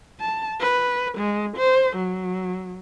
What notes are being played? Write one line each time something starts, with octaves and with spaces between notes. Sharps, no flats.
A5
B4
G#3
C5
F#3